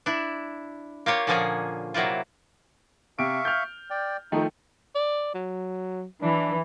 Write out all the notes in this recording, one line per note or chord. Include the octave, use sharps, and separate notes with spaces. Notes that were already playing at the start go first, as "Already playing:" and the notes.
D4 E4
A#3 F4 G4 C#5
A#2 D3 F3 A#3 C#4 G#4
C3 F#3 A#3 E4 F4
C3 E5 F5 C#6 D7
F6 G6
D5 G5
D#3 F3 A3 D#4
D5
F#3
E3 D4